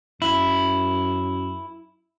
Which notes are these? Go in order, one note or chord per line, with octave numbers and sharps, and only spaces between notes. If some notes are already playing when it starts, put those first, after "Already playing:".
F#2 E4